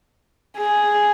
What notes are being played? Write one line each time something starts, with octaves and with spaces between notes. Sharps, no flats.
G#4